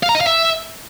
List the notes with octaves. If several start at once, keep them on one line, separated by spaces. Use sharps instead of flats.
F5
A#5
D#5
F5
E5